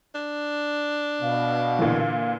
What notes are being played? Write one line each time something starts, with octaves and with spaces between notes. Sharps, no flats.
D4
B2 F5
A#2 D3 E3